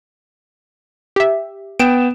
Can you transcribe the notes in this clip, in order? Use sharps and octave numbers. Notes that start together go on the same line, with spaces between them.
G4 E5
B3 G5 D7 E7